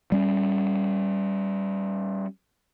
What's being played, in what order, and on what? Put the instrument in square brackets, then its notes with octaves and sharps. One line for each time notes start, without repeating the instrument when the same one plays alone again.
[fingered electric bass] G3 C#4